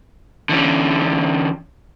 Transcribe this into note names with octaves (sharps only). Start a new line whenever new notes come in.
D3 E3 C#4